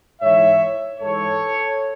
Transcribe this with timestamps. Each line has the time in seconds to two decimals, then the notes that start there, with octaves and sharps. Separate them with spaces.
0.22 G#2 E3 C#5 E5
1.00 G#2 E3 A4 C#5